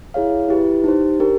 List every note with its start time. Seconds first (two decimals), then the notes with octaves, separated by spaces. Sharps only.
0.14 E4 G#4 C#5 F5
0.48 E4 G4 B4
0.84 D#4 G4 C5
1.20 D4 G4 A#4